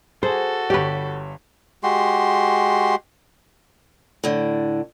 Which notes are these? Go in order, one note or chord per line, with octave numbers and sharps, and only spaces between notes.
F#4 G#4 A4 C5
G1 G4 B4 C#5
G#3 F#4 G4 C6
A2 D3